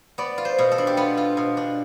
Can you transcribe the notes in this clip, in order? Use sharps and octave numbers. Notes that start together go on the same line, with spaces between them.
B3 D5
F4
C5
B2
A4
D4
G4
B3 F4
F4
B2
D4